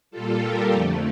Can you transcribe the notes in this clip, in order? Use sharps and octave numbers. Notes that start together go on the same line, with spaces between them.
A#2 G3 F4 A4
G4 A#4
F2 D3 F3 A3